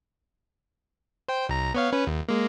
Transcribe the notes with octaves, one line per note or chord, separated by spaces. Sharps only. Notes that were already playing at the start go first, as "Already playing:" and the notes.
C5 G5
C2 A#5
B3 C#5 F5
C#4 B4
D#2
G#3 A#3